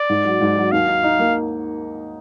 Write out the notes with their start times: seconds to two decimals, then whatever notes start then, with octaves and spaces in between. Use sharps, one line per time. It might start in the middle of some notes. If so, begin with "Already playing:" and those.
Already playing: D5
0.09 G#2
0.25 F#3
0.41 G#2
0.56 F#3
0.72 D#2 F5
0.88 D#4
1.03 D#4
1.19 A#3